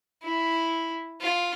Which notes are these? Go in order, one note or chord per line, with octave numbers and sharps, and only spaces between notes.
E4
F4